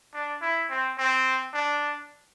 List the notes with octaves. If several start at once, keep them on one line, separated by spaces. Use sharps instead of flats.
D4
E4
C4
C4
D4